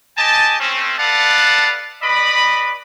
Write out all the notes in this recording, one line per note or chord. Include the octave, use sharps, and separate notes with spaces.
G4 D#5 G#5 A5
A3 C4 C#4
A4 B4 D5 F5 F#5 A5
B4 D5 D#5 B5